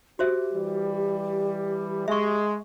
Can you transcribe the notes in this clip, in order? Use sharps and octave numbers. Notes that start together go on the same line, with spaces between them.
F#4 G4 C5 E5
E3 G3
G#3 E5 C#6